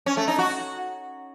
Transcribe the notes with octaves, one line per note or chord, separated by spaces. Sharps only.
C#4
A3
D#4
F#4